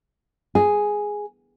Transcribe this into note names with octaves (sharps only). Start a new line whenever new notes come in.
G#4